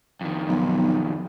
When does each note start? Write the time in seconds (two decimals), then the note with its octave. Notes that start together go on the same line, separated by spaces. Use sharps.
0.21 F2 D#3
0.48 B1